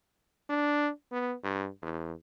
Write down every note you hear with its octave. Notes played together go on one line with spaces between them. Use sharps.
D4
B3
G2
E2